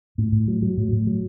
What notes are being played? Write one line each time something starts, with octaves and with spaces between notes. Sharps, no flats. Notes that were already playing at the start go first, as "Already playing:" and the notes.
A2
A2
F#3
F#3
A2
A2
F#3